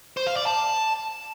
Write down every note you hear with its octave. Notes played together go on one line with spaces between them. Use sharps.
C5
F5
D5
A5